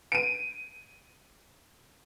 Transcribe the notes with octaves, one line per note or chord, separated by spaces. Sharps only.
D7 D#7